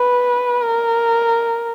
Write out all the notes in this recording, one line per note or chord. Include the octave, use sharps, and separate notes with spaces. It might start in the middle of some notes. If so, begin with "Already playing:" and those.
Already playing: B4
A#4